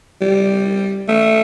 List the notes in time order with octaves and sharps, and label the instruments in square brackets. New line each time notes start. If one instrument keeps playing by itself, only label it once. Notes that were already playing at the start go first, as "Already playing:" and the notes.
[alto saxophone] G3
A3